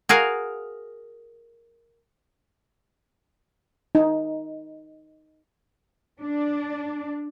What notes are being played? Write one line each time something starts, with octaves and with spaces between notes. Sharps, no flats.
F#4 G#4 A#4 F5
D#4
D4